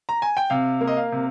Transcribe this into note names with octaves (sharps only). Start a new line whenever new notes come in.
A#5
G#5
G5
C3 F5
A#3
D#5
F5
C3